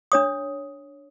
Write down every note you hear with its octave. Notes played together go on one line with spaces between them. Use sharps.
D4 C#5 D#6